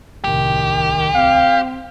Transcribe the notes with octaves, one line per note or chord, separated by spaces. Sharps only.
D1 C2 D#3 G4
C4 F5